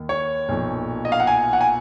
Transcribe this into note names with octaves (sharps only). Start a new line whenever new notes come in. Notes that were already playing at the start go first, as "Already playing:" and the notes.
Already playing: D#2 D#3
C#5
B1 A#2 F3
D#5
F5
F#5
G#5
F#5
G#5